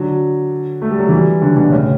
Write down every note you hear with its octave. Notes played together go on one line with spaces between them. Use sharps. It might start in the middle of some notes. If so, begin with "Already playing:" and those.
Already playing: D3 F#3
A3
G3
F#3
E3 G3
D3 F#3
B2 D3
A2 C#3